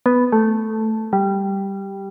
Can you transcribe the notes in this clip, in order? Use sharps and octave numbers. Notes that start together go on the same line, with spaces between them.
B3
A3
G3